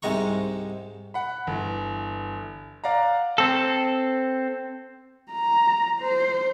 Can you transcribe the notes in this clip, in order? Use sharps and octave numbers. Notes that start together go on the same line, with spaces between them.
C2 G#2 C3 G#3 A#5 C#6
F#5 B5
G1 E3
D5 F5 F#5 A#5
C4 A4
A#5
C5